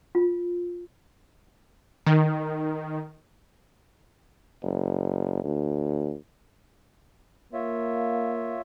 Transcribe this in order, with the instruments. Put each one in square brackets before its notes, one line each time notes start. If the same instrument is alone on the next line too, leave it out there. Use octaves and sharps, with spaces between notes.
[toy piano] F4
[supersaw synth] D#3
[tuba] F#1
D2
[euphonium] A#3 [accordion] F4 C#5 E5